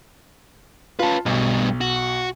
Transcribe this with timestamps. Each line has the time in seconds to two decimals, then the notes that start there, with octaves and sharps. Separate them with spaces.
0.99 C#4 F4 B4 A5
1.26 B1 G2 B2
1.81 F#4